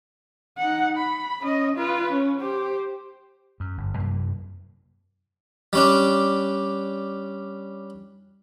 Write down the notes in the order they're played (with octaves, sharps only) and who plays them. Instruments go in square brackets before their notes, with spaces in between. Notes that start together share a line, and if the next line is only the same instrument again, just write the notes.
[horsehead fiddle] D#4 F#5
B5
C#4 D#5
F4 B4
C#4
G4 C5
[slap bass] F#2
G1
F#2 C3 A#3
[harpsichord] G3 C#4 D4